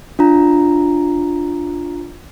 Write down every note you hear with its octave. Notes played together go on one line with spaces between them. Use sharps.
D4 F4 A#5